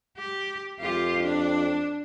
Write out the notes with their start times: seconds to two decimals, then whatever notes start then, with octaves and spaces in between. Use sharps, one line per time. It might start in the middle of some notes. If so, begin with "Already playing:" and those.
0.17 G4
0.80 F2 F4 G4
1.22 D4